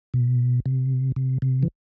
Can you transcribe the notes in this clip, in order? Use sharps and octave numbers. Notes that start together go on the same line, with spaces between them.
B2
C3
C3
C3
E3